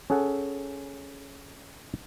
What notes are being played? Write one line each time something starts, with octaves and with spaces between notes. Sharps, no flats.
C#4 G#4 A4 F#5